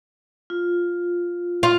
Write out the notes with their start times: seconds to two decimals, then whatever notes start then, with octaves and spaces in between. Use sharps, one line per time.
0.50 F4
1.63 F4